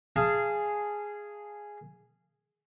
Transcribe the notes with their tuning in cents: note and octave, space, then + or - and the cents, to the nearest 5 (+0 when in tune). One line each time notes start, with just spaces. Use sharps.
G#4 +0 F5 -25 A5 +5